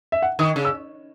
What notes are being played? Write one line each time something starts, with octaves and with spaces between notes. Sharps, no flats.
E5
F#5
D#3 D#6
C#3
E6